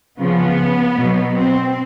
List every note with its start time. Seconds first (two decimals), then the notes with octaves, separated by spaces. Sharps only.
0.19 C#3 F3 B3
0.97 B2 F#3
1.36 C4